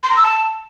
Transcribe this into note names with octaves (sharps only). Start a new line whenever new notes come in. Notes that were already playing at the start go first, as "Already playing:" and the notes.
C6
A#5
E6
A5